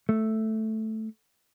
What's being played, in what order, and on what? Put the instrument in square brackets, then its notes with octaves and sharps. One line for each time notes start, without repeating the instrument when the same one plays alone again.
[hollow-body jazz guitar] A3